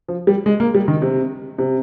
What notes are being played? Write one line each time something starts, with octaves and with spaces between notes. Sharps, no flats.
F3
G3
G#3
A#3
G3
D#3
C3
C3